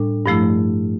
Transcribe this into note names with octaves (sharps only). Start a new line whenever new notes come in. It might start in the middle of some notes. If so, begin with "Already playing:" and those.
Already playing: A2 G3 D4
G2 F3 A3 E4